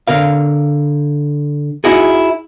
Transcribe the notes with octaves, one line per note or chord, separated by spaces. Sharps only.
D3 A#4 F5
D#4 E4 F#4 G#4